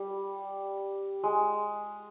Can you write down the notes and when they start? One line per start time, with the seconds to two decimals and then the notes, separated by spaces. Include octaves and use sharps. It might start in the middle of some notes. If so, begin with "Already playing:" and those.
Already playing: G3
1.24 G#3